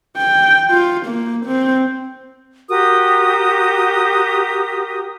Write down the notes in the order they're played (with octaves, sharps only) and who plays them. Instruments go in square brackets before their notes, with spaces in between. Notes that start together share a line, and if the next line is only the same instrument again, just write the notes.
[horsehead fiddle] G5
F4
A#3
C4
[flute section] F#4 G4 A#4 D#6